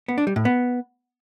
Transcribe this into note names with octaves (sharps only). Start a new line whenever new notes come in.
B3
D4
G3
A2
B3